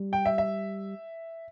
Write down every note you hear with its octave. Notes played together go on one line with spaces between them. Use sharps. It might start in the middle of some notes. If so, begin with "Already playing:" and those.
Already playing: G3
G5
E5
E5